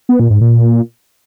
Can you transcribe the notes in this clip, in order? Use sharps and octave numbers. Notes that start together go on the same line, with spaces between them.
B3
A#2
G#2
A#2